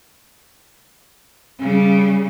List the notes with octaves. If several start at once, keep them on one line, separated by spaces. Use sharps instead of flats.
C#3 G3